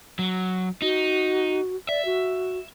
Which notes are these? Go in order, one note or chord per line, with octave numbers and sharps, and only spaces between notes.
F#3
D#4 F#4
D5 E5
F#4